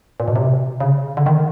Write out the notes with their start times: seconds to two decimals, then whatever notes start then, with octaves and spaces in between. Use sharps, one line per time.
0.20 A#2
0.28 B2
0.36 C3
0.80 C#3
1.17 D3
1.26 D#3